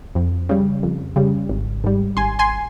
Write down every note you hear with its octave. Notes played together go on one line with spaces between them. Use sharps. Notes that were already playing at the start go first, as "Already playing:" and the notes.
F2
C#3 G3
F2
C#3 G3
G#1
G#2 G3
G#1 G#5 C6
G#5 C6